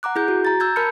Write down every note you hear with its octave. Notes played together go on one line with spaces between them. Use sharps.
F#5 A#5 D6 F#6
E4 G#4 G6
F#4
A#5 A6
A#5 E6 G6 G#6
A#4 A5 B5 F6 G6 C#7